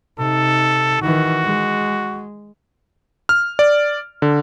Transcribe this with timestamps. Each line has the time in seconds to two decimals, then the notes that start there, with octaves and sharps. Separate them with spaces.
0.19 C3 D#4 A4
1.02 D#3 E3 F#4
1.44 G#3
3.29 F6
3.59 D5
4.22 D3